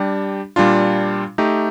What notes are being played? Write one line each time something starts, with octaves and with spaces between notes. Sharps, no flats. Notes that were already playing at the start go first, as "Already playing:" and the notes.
Already playing: G3 D4 G4
A#2 G3 D4 F4
A3 D#4 G4